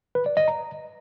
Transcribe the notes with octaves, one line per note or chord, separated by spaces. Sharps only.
B4
D5
D#5
A#5